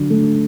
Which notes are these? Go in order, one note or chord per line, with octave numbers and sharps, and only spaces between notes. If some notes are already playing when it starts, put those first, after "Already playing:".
Already playing: D3 F#3
A3